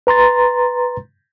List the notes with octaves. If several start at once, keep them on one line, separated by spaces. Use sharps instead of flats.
B4 A#5 C6 A6